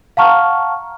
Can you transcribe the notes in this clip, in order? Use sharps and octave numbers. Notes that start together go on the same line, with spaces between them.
F5 F#5 A5 A#5 C#6 F6